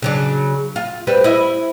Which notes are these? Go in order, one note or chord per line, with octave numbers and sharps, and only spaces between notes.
C#3 F#3 D4
F4
G3 C4 B4
E4 D#5